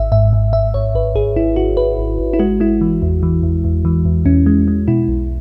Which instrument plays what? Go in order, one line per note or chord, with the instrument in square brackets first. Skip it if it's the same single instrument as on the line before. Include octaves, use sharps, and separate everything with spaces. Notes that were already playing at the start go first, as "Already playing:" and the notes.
Already playing: [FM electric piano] G#1 E5
G#2 E5
G#2
G#2 E5
G#1 C#5
G#1 B4
G#1 G#4
G#1 E4
G#1 F#4
G#1 B4
G#1
G#1
E4
G#3 F#4
G#3 E4
E3
E2
E3
E2
E2
E3
E2
E2 C#4
G#3
G#3
B2 E4
B1